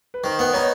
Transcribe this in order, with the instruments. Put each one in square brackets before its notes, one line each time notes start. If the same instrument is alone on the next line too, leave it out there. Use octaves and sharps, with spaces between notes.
[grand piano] B4
[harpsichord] D#3 [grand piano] A#4 C5
[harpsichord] B3
[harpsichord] D#4 [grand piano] B4 C#5